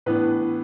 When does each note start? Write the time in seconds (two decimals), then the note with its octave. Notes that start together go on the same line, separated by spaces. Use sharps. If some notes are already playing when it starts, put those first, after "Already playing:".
0.06 A2 E3 B3 D4 B4